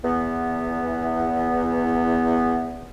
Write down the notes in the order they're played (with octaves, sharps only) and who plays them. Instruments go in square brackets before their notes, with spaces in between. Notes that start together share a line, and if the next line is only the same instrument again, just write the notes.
[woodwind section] E2 B3